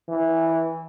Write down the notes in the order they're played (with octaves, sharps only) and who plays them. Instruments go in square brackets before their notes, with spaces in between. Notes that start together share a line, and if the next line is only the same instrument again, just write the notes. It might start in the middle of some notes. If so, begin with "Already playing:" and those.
[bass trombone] E3